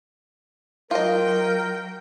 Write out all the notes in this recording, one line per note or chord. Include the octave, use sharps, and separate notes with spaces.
F#3 F4 A#4 D#5 G5